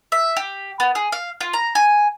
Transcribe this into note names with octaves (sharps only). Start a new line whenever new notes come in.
E5
G4
B3
G#4
F5
F4
A#5
G#5